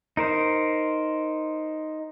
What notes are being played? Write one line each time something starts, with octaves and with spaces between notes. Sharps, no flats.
D#4 A#4 C5